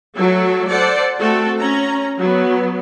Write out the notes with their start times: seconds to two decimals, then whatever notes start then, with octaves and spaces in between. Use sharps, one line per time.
0.16 F#3 A3 A4
0.69 A4 C5 D5 F#5
1.19 A3 C4 F#4 A4
1.60 C#4 A#5
2.18 F#3 B3